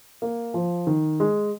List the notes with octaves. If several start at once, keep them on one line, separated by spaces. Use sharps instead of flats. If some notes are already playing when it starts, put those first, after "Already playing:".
A#3
F3
D#3
G#3